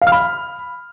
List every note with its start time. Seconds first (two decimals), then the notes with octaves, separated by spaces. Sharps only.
0.02 F5
0.07 F6
0.12 B5